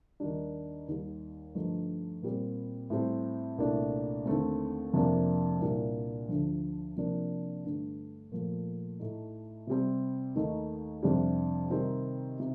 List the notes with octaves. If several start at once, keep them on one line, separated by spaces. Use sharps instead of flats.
D#2 D#3 G3 D4
D#2 D#3 G3
G2 D3 F3 A3 D#4
A#2 G3 C4
A2 G3 C4
C2 A#2 A3 D4
D#2 D3 A3 C4
F2 C3 F3 A#3 D4
C2 A#2 G3 D4
D2 D3 F3
C3 F3 A#3 D4
G2 D3 A3
A#2 F3 A3
A2 A3 D#4
C3 G3 C4
D#2 D#3 A3 D#4
F2 C3 G3 D4
C3 D#3 G3 C4 D#4
C3